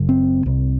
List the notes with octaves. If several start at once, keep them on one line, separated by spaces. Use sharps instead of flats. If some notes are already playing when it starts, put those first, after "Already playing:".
Already playing: F#1 F#2 C#3
C4
C2 C3